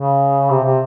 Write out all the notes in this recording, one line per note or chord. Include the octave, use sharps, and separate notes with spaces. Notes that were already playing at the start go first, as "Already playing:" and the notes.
Already playing: C#3
C3
C3